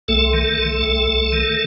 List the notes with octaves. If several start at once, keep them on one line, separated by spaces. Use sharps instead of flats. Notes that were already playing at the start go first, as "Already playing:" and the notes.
C2 A3 A4
D#3
C2
C2
C2
D#3